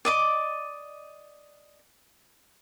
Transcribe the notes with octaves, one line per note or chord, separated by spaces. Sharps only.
D5 D#5 D6